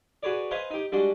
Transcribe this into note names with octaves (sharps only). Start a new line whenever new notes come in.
F#4 G#4 B4 C#5 D5
B4 C5 D#5 F5 G#5 B5
D#4 G4
G3 G#3 D4 F#4